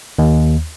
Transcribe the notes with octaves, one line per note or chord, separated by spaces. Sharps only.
D#2